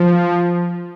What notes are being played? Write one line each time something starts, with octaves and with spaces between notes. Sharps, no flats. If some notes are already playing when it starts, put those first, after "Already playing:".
Already playing: F3